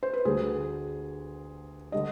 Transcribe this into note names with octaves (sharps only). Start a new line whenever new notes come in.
C5
B4
D2 D3 G3 G#4
D3 G3 D#5